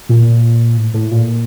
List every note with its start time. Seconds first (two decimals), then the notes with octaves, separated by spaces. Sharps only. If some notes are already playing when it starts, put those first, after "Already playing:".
0.09 A#2
0.77 A2
0.94 A2
1.11 A#2